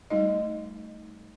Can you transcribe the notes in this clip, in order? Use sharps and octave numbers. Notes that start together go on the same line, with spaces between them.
G3 A3 D#4 D#5